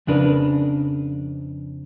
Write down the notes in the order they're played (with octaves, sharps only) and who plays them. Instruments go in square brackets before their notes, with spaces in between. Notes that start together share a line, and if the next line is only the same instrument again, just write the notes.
[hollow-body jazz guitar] F2 C#3 D4 A#4 B4